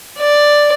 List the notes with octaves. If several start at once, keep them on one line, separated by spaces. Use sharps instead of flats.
D5